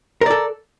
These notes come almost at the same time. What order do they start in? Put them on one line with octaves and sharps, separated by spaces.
A#4 D5 A4